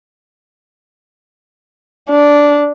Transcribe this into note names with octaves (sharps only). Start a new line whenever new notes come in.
D4